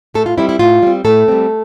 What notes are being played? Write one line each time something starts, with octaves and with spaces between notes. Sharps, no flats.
A2 A3 A4
F4
G3 C4 E4
E4
A2 F4
G3 C4
A2 A3 A4
G3 C4